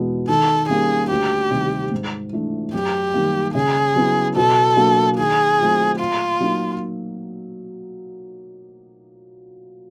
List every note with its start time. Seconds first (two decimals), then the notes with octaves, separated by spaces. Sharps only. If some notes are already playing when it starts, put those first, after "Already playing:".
Already playing: E2 B2 G#3 B3
0.29 D#3 A4
0.69 G3 A#3 C#4 G#4
1.10 D2 G4
1.51 C3 D#3 G3
1.92 G#2
2.33 E3 A3 D4
2.73 F#2 G4
3.14 D#3 G3 A#3
3.54 C#3 G#4
3.96 F#3 B3 E4
4.36 B2 A4
4.77 F#3 A#3 D4
5.18 D#3 G#4
5.59 F#3 A3 C4 F4
5.99 A#2 F4
6.40 F#3 A#3 D#4